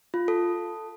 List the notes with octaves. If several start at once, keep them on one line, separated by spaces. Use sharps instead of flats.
F4
A4